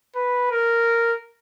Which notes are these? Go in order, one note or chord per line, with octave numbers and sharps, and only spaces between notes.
B4
A#4